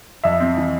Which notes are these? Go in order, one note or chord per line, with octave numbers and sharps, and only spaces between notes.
F2 E5
C4
E3